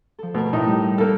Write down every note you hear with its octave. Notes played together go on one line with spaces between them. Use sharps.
F3 A4
B2 A3 A#4
A2 D#4 A#5
G3
A#3 F4 A4 G6